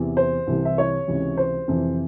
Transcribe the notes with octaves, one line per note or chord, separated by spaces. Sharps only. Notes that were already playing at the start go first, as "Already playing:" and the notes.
Already playing: E2 C3 E3
C5
C2 C3 E3
E5
C#5
C#2 C3 E3
C5
F2 C3 E3